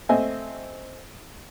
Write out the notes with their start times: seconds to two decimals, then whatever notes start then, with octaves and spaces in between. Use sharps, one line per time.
0.09 A3 C4 D#5 E5 G#5